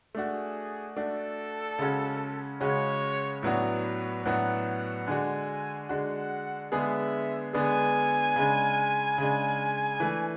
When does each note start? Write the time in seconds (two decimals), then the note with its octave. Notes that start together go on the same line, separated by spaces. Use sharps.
0.14 A3 D4 F#4 G#4
0.96 A3 D4 F#4 A4
1.79 C#3 G#3 C#4 F#4
2.61 C#3 G#3 C#4 F#4 C#5
3.43 A2 F#3 B3 D4 F#4
3.84 B4
4.25 A2 F#3 B3 D4 F#4 F#5
4.67 F#5
5.08 D3 G#3 D4 F#4 G#5
5.89 D3 G#3 D4 F#4 F#5
6.72 D3 G#3 B3 D4 G#4 E5
7.53 D3 G#3 B3 D4 G#4 G#5
8.36 C#3 G#3 D4
9.18 C#3 G#3 D4
10.00 E3 A3 D4